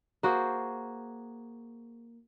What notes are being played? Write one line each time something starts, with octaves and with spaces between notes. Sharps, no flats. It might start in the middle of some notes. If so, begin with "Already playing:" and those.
A#3 F#4 G#4 C5